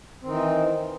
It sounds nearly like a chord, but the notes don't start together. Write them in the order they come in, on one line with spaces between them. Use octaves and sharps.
C4 D#3 D#4 E3